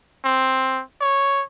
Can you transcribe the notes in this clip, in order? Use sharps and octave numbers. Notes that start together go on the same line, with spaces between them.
C4
C#5